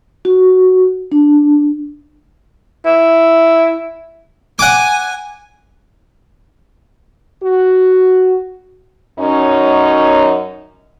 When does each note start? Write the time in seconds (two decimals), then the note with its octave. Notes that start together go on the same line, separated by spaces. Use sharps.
0.25 F#4
1.12 D4
2.86 E4
4.59 F#5 G#5 D6
7.44 F#4
9.19 F#2 C#4 D#4